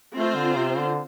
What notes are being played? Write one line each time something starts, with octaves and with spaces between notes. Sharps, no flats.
A3 C4 F4 C5
D3
C3
D3